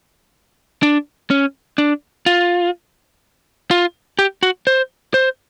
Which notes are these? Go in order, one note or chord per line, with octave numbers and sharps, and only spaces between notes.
D4
C#4
D4
F4
F4
G4
F#4
C5
C5